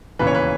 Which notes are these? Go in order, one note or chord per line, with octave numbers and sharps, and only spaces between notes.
E1 D#2 C#3 E3 B4
C#5
B4